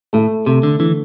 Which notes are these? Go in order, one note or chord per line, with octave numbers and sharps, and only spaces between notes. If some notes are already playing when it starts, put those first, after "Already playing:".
A2 A3
C3 A3
D3
D3 E3